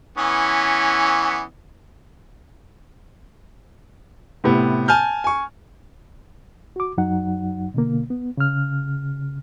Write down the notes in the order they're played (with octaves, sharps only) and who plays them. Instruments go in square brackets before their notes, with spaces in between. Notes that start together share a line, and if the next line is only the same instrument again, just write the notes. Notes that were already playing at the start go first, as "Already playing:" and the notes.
[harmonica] E3 B3 C#4
[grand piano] A2 C3 B3
G#5 A5 F6 G6
G#5 C#6
[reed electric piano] F#4 D6
F#2 F#3 D#4 F#5
B2 D3 A#3
B3
C#3 F6